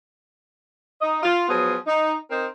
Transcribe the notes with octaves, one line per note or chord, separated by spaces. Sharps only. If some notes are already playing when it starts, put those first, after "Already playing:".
D#4 D#5
F4
F3 F#3 B3 G#4
D#4
C4 D#4 A#4 C5